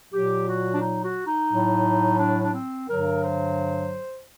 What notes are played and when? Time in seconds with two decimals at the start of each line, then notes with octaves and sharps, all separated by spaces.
0.12 A#2 F#3 G4
0.47 F#4
0.73 D4
0.81 D#4
1.04 F#4
1.27 D#4
1.50 A2 F#3
2.18 D4
2.42 D4
2.53 C4
2.87 G2 D3 F#3 A#4
3.22 C5